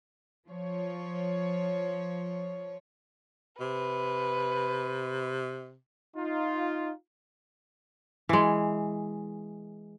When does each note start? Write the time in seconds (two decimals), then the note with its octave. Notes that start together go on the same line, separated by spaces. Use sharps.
0.47 F3 C#5
3.60 C3 B4
6.16 D#4 F4
8.29 E3 G#3